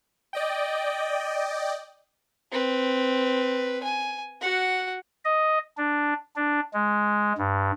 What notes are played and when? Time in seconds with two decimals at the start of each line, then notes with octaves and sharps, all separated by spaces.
0.33 D5 D#5 G5
2.51 C4 B4
3.83 G#5
4.41 F#4 F#5
5.25 D#5
5.77 D4
6.36 D4
6.74 G#3
7.38 G2